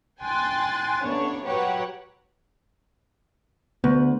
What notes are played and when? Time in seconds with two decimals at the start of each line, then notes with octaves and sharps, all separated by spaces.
0.21 G5 G#5 C6 F#6 A6
1.03 A1 B3 D4 C#5
1.44 F#3 G4 B4 C#5 F#5
3.84 D2 B3